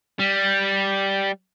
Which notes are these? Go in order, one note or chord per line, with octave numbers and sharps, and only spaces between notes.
G3